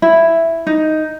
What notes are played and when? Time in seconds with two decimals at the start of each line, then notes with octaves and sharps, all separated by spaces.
0.02 E4
0.67 D#4